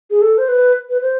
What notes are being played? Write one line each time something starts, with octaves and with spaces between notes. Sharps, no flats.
G#4
A4
C5
B4
B4
C5